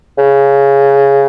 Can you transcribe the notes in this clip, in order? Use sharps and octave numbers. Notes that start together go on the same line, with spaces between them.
C#3